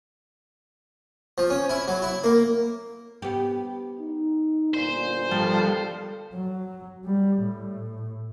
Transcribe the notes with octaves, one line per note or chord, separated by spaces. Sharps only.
F3
C#4
E4
F#3
E4
A#3
B3 G4
D#4
G1 A#2 C5
D3 F3 G3 A4
F#3
G3
A2